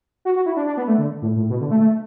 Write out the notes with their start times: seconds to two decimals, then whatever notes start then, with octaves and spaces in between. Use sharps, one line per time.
0.25 F#4
0.36 F#4
0.46 E4
0.56 D4
0.67 D4
0.77 B3
0.88 A3
0.98 D3
1.22 A2
1.36 A2
1.50 B2
1.61 D3
1.71 A3
1.81 A3